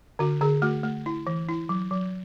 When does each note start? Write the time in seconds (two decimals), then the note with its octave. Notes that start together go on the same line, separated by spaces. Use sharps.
0.19 D3 F#4
0.41 D3 G#4
0.62 A3 F#4
0.84 A3
1.06 E4
1.27 E3
1.49 E4
1.69 F#3
1.91 F#3